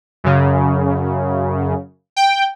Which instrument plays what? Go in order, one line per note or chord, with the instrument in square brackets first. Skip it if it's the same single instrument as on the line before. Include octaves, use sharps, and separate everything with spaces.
[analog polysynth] F#2 C#3
G5